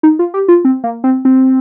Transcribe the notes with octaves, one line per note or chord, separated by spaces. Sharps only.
D#4
F4
G4
F4
C4
A#3
C4
C4